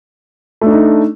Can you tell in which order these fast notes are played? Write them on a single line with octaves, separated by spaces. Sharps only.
A3 D4 D#4